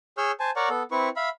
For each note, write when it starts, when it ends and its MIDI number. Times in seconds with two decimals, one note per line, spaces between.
0.18 0.32 68
0.18 0.32 73
0.18 0.32 88
0.18 0.32 89
0.18 0.32 91
0.40 0.51 72
0.40 0.51 80
0.40 0.51 81
0.56 0.69 70
0.56 0.69 73
0.56 0.69 74
0.56 0.69 78
0.56 0.69 82
0.56 0.69 85
0.69 0.83 59
0.69 0.83 69
0.91 1.09 60
0.91 1.09 64
0.91 1.09 71
0.91 1.09 85
1.16 1.29 76
1.16 1.29 77
1.16 1.29 83